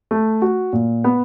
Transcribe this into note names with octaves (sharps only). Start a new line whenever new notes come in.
A3
F#4
A#2
B3